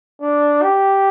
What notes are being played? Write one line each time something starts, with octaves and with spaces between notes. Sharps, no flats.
D4
G4